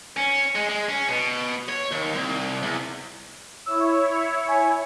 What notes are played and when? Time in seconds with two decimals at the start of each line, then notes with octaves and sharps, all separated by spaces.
0.17 C#4
0.56 G#3
0.69 G#3
0.89 C#4
1.09 B2
1.68 C#5
1.91 D#2
2.14 C2
2.62 E2
3.66 E4 C#5 E6
4.48 G#5